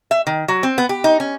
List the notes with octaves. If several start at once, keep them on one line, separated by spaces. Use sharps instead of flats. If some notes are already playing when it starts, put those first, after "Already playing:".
E5
D#3
F#3
C4
B3
G4
D#4
C#4